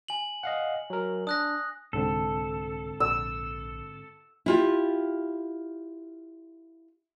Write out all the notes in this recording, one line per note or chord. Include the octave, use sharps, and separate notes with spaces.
G#5 F#7
D#5 F5 F#5
F#3 A#4
D4 D#6 F#6 A#6
C2 G#2 D3 C4 A4
A#1 E6
E4 F4 G4